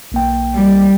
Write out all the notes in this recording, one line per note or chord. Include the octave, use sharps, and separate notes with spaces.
B1 A#3 G5
G3